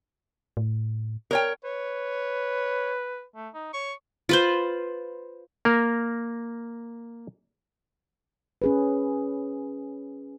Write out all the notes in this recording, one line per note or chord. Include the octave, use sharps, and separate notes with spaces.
A2
A#4 C#5 G5
B4 C#5
A3
D#4
C#5 C#6
F4 B4 C5
A#3 A#4
C#4 G#4 B4